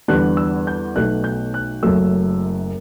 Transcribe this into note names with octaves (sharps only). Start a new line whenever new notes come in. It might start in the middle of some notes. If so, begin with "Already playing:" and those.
E2 D3 G3 B3 D4 F#6
E6
G6
B1 B2 A3 F#6
G6
F#6
F#1 F#2 F#3 A3 E6